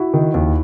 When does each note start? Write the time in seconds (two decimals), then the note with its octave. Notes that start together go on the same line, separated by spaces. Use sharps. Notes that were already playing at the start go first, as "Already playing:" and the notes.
Already playing: E4 F#4
0.14 D#3
0.34 D#2